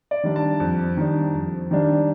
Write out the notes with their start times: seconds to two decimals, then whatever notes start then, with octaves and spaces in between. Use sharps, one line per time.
0.11 D5
0.23 D#3 G3 D4
0.36 A5
0.60 F2
0.97 D#3 G3 D4
1.34 F2
1.71 D#3 G3 D4